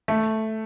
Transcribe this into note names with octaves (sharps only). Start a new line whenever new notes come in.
A3